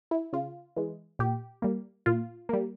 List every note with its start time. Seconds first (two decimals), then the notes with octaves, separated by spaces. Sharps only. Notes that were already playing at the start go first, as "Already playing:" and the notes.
0.11 E4
0.33 C#3 F4
0.76 E3 G#3
1.19 A#2 G4
1.62 G3 A#3
2.06 A#2 F4
2.49 G3 A#3